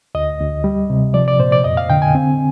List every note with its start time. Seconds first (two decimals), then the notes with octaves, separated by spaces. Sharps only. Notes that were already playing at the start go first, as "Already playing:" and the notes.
0.15 D2 D#5
0.40 D2
0.64 G3
0.90 C3
1.14 F3 D5
1.28 D5
1.39 A#2 C5
1.52 D5
1.64 F2 D#5
1.77 F5
1.90 D3 G5
2.02 G#5
2.15 C4